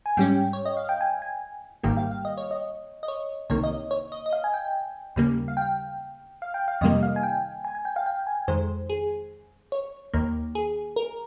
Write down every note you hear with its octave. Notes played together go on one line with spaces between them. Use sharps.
G#5
G#2 G3 C#4 G5
C#5
D#5
F5
G5
G#5
G#5
G#1 G#2 D#3 G3 A#3 G5
F5
F5
D#5
C#5
D#5
D#5
C#5
C2 C3 D#3 A#3 C#5
D#5
C#5
D#5
D#5
F5
G#5
G5
D#2 C#3 G3 A#3
F5
G5
F5
G5
F5
F2 C3 D#3 G3 A#3 D#5
F5
G#5
G5
G#5
G#5
G5
F5
G5
G#5
F2 D#3 G#3 C5
G#4
C#5
D#2 D#3 A#3
G#4
A#4